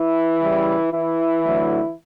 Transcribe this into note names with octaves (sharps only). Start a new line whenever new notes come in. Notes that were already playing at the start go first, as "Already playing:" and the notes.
Already playing: E3 E4
C#3 G3
E3 E4
D3 F#3 A3